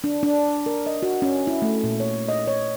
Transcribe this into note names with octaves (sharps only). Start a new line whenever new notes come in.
D4
D4
A#4
D#5
F#4
C#4
E4
A3
A#2
C#5
D#5
C#5